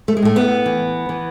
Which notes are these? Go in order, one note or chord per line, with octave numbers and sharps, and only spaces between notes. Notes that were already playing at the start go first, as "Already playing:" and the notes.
A3
G#3
A2 A3
B3
E3
E3